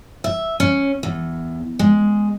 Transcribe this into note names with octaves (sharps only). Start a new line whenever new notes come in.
E5
C#4
E2
G#3